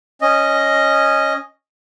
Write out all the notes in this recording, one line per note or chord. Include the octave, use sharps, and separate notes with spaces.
C#4 D#5